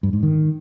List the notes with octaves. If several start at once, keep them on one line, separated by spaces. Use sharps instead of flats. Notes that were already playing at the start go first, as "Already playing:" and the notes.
G2
G#2
D#3